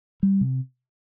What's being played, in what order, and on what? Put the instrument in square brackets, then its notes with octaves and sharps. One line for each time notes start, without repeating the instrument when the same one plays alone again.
[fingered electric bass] G3
C3